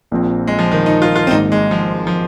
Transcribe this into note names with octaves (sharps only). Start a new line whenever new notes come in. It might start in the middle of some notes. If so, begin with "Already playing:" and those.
A#1 A#2 F3 C4
G#3
F3
D#3
D#4
F4
F4
C4
G#1 G#2 D#3 A#3 D#4
G#3
F3
F3